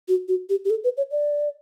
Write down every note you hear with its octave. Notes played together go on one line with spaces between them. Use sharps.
F#4
F#4
G4
G4
A4
B4
C#5
D5